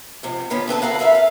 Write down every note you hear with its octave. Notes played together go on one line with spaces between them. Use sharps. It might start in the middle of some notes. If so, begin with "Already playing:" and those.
G#2 C3 F3
D3 D#3 B3 C#4 F4
D3 C4 B4 A5
A4 A#4 F5 F#5
A4 B4 E5 F5
F5